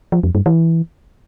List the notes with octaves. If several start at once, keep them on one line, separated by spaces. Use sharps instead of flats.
F3
F2
G2
E3